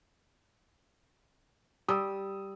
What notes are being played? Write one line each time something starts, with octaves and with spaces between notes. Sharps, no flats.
G3 D#6 E6